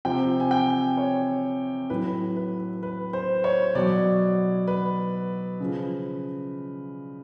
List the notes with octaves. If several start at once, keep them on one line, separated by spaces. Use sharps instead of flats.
C3 F3 G5
G#5
G5
C#5
A2 F#3 B4
B4
B4
C5
C#5
B2 F#3 D5
B4
C#3 F3